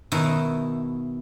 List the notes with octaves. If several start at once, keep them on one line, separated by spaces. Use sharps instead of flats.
B2 D#3 D#4 E4